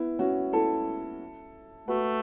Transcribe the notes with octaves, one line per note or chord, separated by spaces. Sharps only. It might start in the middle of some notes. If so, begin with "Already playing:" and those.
Already playing: B3 E4
C#4 F#4
E4 A4
A3 F#4 B4